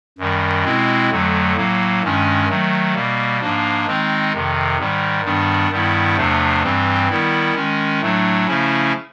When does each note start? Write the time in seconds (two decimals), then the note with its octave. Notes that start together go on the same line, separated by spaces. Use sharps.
0.18 F#2 D#3 G3
0.64 B2 G#3 C4 E4
1.11 F2 D3 F#3 A3
1.56 A2 F#3 A#3
2.03 G2 D#3 G#3 C#4
2.49 D#3 F#3 A3
2.94 B2 G3 A#3
3.40 G#2 F3 A#3 D4
3.87 D#3 G#3 C4 D#4
4.33 F2 C3 D#3
4.79 G#2 D#3 G3
5.24 G2 D#3 G3 B3 D4
5.70 G2 D#3 G3 B3 E4
6.17 E2 C3 F3 A3 D4
6.63 G2 E3 G3 C4
7.09 D#3 G3 B3 E4
7.55 D#3 G#3 C#4
8.01 A2 F#3 A3 D4
8.47 C#3 F3 A3 C#4 E4